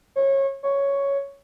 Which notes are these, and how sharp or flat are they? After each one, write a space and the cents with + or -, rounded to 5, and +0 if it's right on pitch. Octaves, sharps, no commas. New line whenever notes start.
C#5 -25
C#5 +5